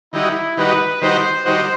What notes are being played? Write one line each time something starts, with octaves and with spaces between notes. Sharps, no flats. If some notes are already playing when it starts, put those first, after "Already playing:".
D#3 G3 D#4 E4 F#4
D#3 G3 D#4 F#4 B4
D#3 G3 D#4 F#4 C5
D#3 G3 D#4 F#4 C5